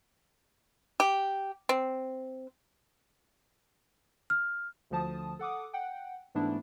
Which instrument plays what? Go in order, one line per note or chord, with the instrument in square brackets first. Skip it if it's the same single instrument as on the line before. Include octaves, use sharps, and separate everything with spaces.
[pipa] G4
C4
[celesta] F6
[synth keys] D2 D3 F3 A5 D#6
A4 F#5 D6 D#6
F#5 G5
G#2 E3 A3 B3 D4 E4